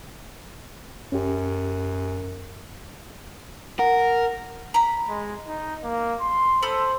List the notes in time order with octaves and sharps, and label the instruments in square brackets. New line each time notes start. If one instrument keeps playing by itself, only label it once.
[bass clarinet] F#2 [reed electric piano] C#4 G4
[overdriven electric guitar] A#4 [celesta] F#5
[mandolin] A#5 B5
[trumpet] G#3
D#4
A#3
C6
[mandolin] A4 B5 D#6 [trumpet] C5